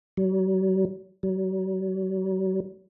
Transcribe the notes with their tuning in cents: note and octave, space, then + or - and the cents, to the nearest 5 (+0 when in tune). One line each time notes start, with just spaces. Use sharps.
F#3 +40
F#3 +40